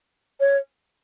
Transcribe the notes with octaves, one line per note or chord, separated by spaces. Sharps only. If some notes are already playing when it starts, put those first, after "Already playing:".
C#5